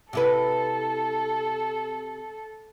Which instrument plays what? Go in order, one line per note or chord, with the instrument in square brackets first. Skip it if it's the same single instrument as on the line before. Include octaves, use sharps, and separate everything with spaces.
[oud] C3 E4 B4 [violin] A4